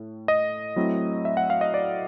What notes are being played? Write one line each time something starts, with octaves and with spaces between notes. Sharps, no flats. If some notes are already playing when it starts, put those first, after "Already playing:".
Already playing: A2
D#5
F#3 A3 C4 E4
E5
F#5
F5
D#5
D5